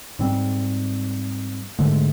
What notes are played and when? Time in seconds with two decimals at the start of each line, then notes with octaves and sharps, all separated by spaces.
0.19 G#2 G3 C4
1.79 G#2 D3 G#3 A3